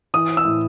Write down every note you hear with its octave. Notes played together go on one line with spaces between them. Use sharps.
E3 D#6
E6
A2